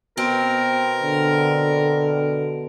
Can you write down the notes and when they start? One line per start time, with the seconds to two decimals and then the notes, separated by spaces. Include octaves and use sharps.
0.17 B2 C4 A#4
1.03 D3